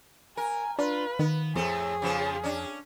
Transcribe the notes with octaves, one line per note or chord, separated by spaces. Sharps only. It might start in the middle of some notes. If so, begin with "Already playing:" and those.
A#4 G#5
D4 F4 B4
D#3 B3
F2 A2 A3 C4 G#4
C#3 F3 B3
C#4 D4